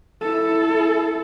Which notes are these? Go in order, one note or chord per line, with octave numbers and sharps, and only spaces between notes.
E4 A4